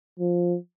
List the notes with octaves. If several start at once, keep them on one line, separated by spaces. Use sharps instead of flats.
F3